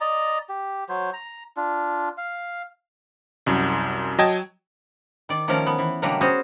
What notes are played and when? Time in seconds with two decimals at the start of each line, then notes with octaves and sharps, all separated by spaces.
0.01 D5 D#5 A#5
0.49 G4
0.89 F#3 C5
1.13 A#5
1.57 D4 F4
2.18 F5
3.46 C2 F#2
4.18 F#3 D#5 G5 A5 G#6
5.29 D#3 D5
5.48 D#3 F3 A3 C#4 A#4
5.66 B3
5.78 E3
6.02 B2 D3 F#3 G3 A3 A#3
6.21 B3 C#4 F#4 G#4 C5